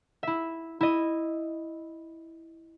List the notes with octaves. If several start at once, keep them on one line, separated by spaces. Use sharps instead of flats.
E4 E5
E4 D#5